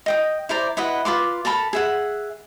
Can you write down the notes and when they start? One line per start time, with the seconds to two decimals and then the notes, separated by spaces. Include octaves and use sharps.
0.06 D#5 G5 D#6
0.49 E4 C5 D5 A#5
0.77 E4 B4 D#5 F#5
1.05 F4 B4 C6 D6
1.45 A4 A#4 A5 B5
1.73 G#4 E5 F#5